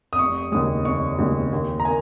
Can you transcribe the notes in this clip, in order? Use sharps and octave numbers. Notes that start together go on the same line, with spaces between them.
D#6
F1 C#6
D#2 C#3 G#3 D#6
F1 C#6
D#2 C#3 G#3
D#2
A#5
A#3 G#5